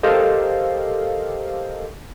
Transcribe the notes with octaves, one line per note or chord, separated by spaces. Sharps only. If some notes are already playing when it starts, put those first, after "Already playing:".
G4 A4 A#4 C5 D#5 F5